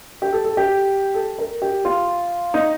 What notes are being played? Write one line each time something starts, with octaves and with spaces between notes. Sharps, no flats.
G4
A4
A4
G4
A4
A#4
G4
F4
D#4